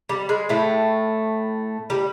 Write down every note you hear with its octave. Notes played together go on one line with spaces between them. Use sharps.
G3
G#3
A2 A3
G3